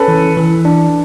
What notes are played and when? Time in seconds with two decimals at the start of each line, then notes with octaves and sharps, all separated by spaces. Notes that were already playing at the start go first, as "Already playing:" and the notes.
Already playing: C#4 A4 B4
0.08 E3
0.37 E3
0.65 D4